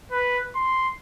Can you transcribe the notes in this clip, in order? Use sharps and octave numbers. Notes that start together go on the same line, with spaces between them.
B4
C6